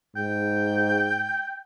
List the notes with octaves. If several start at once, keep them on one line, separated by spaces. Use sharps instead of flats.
G#2 G5